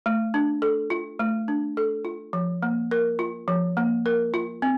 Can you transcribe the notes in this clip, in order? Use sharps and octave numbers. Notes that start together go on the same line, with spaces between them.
A3
D4
A4
F4
A3
D4
A4
F4
F3
A#3
A#4
F4
F3
A#3
A#4
F4
C4